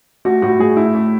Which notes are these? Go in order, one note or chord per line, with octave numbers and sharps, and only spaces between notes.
A3 F#4
A2 F#4
A2 G#4
A3 E4
A3